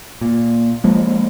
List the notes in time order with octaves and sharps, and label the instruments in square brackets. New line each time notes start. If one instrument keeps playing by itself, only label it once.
[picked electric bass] A#2
F3 G#3 A#3